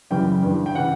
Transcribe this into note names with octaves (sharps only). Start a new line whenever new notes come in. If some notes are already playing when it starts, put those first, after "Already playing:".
F#2 C#3 E3 G3 G5
G2 E3 G3
G5
C#3 E3 F#5